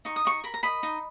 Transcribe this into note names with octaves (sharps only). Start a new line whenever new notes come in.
D#4 C#6
D#6
D#4 C#6
A#4 B5
A#5
D#5 B5
D#4